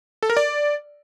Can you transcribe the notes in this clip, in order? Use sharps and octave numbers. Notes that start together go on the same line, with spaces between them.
A4
A#4
D5